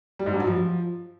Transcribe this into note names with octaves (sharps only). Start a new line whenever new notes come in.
G3
G#2
G2
F#3
F3